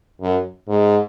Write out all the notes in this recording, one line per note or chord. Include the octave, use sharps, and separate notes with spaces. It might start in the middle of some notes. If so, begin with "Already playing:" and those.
F#2
G#2